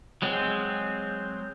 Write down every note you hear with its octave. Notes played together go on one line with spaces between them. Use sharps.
F#3 G#3 C4